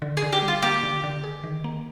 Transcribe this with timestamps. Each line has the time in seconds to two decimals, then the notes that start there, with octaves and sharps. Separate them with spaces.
0.02 D3
0.17 G#4
0.22 D3
0.33 G4
0.42 G3
0.48 F4
0.62 A#3 G4
0.83 D3
1.03 D3
1.24 G#4
1.44 D#3
1.64 A#3